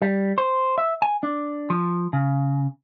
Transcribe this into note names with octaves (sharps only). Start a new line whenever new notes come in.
G3
C5
E5
G#5
D4
F3
C#3